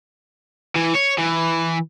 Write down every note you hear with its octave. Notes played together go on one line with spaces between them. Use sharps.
E3
C#5
E3